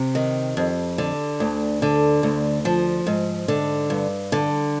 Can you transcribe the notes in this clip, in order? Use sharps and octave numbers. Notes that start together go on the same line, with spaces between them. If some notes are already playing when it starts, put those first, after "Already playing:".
Already playing: C3
D#3
F2
D3
D2
D3
D2
F3
G#2
D3
G2
D3